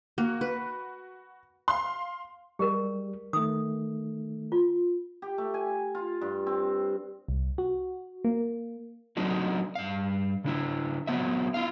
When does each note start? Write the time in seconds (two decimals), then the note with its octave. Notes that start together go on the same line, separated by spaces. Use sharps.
0.18 A#3 F#4
0.41 B4
1.68 F5 C6
2.59 G3 G#3 G4 A#4
3.33 D#3 A3 D#6
4.52 F4
5.22 G4
5.38 A3
5.54 G#5
5.95 F4
6.21 G2
6.46 C4
7.28 C2
7.58 F#4
8.24 A#3
9.17 F#3 C4 D4 D#4 F#4
9.75 G2 F5
10.44 C#3 D4 E4
11.07 F#3 B3 C4 E5
11.54 E4 F4 F5